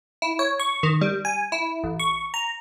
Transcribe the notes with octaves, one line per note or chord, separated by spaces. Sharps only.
E4
C#5
C#6
D#3
G3
G#5
E4
A1
C#6
A#5